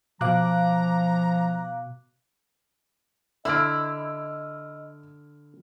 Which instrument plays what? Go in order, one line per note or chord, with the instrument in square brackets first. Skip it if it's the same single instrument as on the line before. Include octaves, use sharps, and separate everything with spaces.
[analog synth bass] B2 [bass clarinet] F3 [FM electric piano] F5 D6 F#6 [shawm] A#5
[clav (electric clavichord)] D3 [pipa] E4 [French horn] D#5 [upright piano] E6 F6 D7